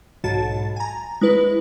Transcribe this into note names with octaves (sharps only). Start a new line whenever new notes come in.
B1 G#2 F#4 A5 A6
G#5 A#5
G#3 E4 B4